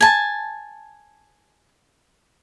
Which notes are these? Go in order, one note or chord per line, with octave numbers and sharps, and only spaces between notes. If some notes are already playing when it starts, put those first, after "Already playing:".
G#5 A5